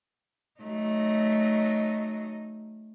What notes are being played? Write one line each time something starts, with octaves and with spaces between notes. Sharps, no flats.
F#3 A3 D#4